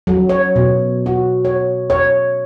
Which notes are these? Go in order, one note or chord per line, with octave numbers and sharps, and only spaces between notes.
F#3
C#5
B2
F#4
C#5
C#5